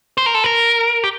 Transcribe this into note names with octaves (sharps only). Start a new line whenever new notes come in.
C5
A#4
A4
A#4
G4